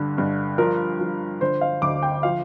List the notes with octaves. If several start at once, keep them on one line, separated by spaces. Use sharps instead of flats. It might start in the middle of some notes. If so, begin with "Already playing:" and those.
Already playing: G2 D3
G2
F3 A#4
F3
D3 C5
F5
D2 D6
G5
F3 F5